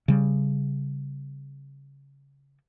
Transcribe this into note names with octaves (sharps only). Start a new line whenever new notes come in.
C#3 G3